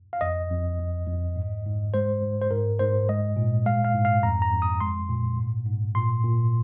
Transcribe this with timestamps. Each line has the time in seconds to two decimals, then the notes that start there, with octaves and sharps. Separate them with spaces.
0.13 F5
0.21 F2 D#5
0.50 F2
0.79 F2
1.07 F2
1.36 G#2
1.66 G#2
1.94 G#3 C5
2.22 G#2
2.42 C5
2.51 G#2 A#4
2.79 G#2 C5
3.09 G#3 D#5
3.37 A#2
3.66 G#3 F5
3.84 F5
3.94 G#2
4.05 F5
4.23 F2 A#5
4.42 A#5
4.53 F2
4.62 D#6
4.80 G#3 C6
5.09 A#2
5.38 G#2
5.67 G#2
5.95 A#2 C6
6.24 A#2